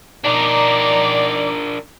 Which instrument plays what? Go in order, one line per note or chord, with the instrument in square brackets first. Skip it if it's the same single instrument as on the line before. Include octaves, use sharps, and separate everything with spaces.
[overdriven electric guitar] D4 A#4 [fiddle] D#4 A#5 [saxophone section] D5